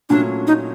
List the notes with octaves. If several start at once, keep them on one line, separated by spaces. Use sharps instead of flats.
A#2 F#3 A3 C#4 D4
D#4